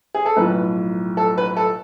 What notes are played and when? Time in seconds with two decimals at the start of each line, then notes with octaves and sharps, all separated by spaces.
0.14 G#4
0.25 A4
0.37 B1 A2 F3 B4
1.17 A4
1.38 B4
1.56 A4